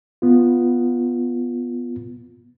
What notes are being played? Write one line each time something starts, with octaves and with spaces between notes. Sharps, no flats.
B3 F4